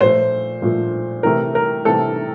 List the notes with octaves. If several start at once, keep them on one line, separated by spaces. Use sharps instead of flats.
A#2 F3 A3 C5
A#2 F3 A3
C3 E3 A3 A#4
A#4
C3 E3 A3 A4